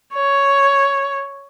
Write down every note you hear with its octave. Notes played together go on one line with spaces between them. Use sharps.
C#5